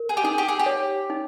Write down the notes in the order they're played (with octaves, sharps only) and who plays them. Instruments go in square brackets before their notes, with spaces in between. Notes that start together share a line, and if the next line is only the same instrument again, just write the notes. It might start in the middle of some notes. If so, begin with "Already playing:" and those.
Already playing: [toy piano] A#4
[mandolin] G#4
G4
[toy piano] D#4 [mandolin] G#4
[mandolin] G4
G#4
G4
[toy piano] C#5
D#4